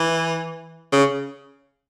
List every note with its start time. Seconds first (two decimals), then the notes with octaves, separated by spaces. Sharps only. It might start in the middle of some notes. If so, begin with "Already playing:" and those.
Already playing: E3
0.92 C#3